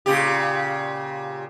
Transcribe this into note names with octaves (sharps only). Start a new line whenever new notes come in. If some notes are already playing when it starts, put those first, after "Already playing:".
A#2 C#3 G4